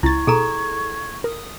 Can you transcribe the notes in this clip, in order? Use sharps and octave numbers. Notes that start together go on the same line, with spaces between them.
C#2 E4 C#6 G#6 A6
B2 G#4 A4 A#5
A#4 D#6